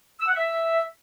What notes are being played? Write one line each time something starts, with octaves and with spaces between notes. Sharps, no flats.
E6
F#5
E5